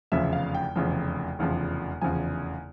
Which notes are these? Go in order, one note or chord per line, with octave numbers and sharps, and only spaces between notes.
F1 E2 C#3 F3 E5
F5
G5
F1 E2 C#3 F3
F1 E2 C#3 F3
F1 E2 C#3 F3 G#5